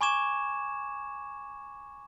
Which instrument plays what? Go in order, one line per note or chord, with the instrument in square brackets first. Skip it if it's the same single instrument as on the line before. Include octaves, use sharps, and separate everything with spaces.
[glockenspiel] G#5 B5 C#6 D6 G#6 E7